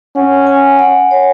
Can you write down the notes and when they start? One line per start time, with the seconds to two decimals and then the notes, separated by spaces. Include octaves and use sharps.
0.16 C#4 F#5
0.47 G#5
0.79 F#5
1.11 C#5